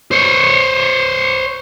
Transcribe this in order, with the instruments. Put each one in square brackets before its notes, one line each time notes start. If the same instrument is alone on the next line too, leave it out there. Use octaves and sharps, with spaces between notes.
[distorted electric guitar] C5 C#5